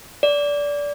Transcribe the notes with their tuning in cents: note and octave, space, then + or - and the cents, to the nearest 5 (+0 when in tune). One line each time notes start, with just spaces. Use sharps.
D5 -20